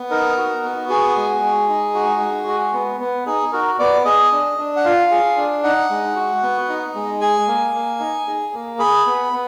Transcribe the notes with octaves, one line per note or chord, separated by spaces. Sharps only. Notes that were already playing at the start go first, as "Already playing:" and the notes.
Already playing: B3
D#4 A#4
F#4
B3
F#4 G#4
G#3
G#3
D#4
F#4
G#3
F#4
B3
B3
D#4 G#4
F#4 A#4
B3 D5
G#4 D#5
D4
D4
F#5
F4 F5
G#4
D4
D#4 F#5
G#3
F#4
B3
D#4
G#3
G#4 G#5
A#3
A#3
D#4
G#4
A#3
G#4 B5
B3
B3